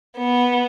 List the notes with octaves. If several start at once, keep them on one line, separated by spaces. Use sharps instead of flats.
B3